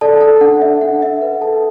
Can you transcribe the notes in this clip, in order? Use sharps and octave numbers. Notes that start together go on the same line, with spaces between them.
A4 D5 A5
A4 A5
D4 F#5
E5
D4 F#5
E5
B4 F#5
A4 A5